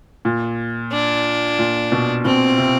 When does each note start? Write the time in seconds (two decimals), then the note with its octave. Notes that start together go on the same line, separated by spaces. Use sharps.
0.25 A#2
0.92 D4
1.59 A#2
1.92 B2
2.25 B2 C4
2.58 C3